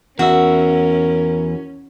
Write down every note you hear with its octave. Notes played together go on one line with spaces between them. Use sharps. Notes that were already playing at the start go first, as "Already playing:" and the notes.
E2 C#4 F#4 A#4 E5